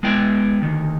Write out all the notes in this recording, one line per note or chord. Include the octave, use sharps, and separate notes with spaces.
G#3 B3 E4 G5
D2 D#3